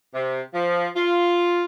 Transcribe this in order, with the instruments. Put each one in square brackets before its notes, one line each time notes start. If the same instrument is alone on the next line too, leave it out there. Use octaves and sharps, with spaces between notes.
[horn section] C3
F3
F4